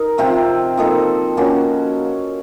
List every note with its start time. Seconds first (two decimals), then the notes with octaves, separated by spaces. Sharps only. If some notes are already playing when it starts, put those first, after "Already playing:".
Already playing: D#4 A#4
0.18 C3 F3 C4 F4
0.77 F3 A#3 D#4 A4
1.37 F3 A#3 C#4 F#4